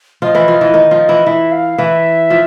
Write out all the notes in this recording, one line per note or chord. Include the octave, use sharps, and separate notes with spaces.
F3 F4 D#5
E3 E4
F3 F4
E3 E4
D#3 D#4
F3 F4
E3 E4
E3 E4 E5
F5
E3 E4 E5
F3 F4